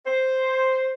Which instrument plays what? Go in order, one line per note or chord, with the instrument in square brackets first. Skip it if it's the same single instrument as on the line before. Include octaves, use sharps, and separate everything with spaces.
[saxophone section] C5